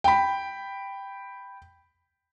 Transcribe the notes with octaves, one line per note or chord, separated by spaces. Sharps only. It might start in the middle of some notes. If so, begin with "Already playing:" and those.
G5 B5